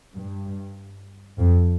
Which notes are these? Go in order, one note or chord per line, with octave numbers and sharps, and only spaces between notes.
G2
F2